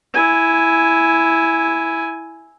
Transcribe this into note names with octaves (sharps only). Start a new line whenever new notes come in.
E4 G#5